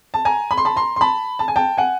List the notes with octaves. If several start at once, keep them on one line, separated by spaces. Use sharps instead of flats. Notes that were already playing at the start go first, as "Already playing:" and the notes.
A5
G#5 A#5
B5
C6
A5 B5
A#5 C6
C6
A5 B5
A5
G#5
G5 A5
F#5 G#5